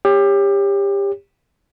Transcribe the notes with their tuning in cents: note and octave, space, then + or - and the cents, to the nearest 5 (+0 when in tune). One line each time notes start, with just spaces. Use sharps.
G4 +25 C#5 +0